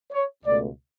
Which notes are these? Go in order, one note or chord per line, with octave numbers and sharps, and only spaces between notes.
C#5
C#2 B2 A3 D5